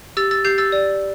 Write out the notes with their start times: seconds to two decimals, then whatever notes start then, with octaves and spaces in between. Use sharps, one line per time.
0.17 G4 E6 A6
0.31 E6 A6
0.45 G4 G6 C7
0.58 E6 A6
0.72 D5